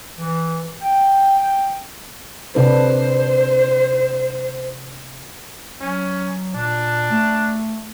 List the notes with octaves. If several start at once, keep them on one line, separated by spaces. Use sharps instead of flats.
E3
G5
C3 D4 B4 C5
F#3 C#4
A#2 D4
A3